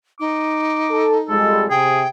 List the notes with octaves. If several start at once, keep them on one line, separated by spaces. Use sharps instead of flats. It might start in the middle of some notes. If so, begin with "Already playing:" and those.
D#4 D6
A4
F2 G3 G#3 A4
C3 G#4 G5